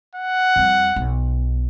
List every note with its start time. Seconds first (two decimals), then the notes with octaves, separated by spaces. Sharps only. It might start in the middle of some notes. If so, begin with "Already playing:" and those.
0.15 F#5
0.56 F2 G3
0.96 B1